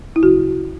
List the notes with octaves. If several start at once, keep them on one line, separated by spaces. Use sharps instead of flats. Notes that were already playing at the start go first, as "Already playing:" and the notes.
E4
D2 C#3 F#3 F#4